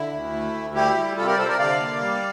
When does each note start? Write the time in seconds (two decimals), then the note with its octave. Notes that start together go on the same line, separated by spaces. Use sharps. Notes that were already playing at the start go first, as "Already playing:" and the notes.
Already playing: D3 E4
0.11 D2
0.33 A3
0.54 D2
0.74 G3 E4 G4
0.95 G3
1.17 C3 F4 A4
1.27 G4 A#4
1.33 D5
1.38 C3 A4 C5
1.48 A#4 D5
1.59 D3 D5 F5
1.80 A#3
2.01 G3